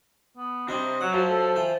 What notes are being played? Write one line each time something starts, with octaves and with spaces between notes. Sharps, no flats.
B3
C3 G3 C4 D4 D#5
F#3 F#5
F#2 C5 F5
A4
E3 G5